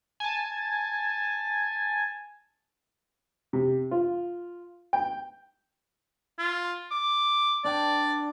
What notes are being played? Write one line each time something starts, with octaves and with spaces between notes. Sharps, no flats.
G#5 A5
C3
F4
G5
F4
D6
D4 D5 G5